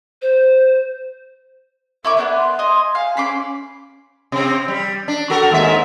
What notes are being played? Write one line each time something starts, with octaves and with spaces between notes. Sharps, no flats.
C5
E4 A#4 C#5 D6
B3 C4 D4
C6
D#5 G#5
F5 G#5
C#4 B5 C6 D6
C3 C4
G3
D4
F#4 A4 A#4
D#2 G#2 E5